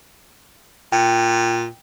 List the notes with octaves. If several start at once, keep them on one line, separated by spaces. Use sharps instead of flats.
A#2 G5